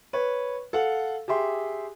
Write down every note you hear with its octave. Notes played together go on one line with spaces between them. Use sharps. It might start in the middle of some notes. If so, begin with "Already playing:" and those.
B4 C#5
A4 F5 F#5
G4 G#4 E5 C6